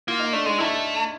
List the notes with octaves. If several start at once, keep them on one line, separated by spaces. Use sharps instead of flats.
A#3 F4
D#4
A3 D4
G#3 D#4
A3 E4